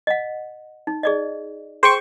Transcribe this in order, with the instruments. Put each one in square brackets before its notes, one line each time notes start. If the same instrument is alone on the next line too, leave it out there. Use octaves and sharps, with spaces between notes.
[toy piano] D#5 F#5
D#4
G#4 D5 D#5
[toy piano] G#4 [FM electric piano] C5 G5 C#6